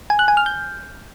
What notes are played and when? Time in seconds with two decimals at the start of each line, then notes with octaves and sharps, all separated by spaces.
0.10 G#5
0.19 F#6
0.28 G#5
0.37 F6
0.46 G6